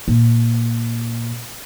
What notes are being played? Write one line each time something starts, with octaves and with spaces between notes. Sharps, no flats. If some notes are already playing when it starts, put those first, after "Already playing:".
A#2